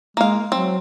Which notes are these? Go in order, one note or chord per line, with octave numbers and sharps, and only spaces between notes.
G#3 A#3 F5
F#3 C4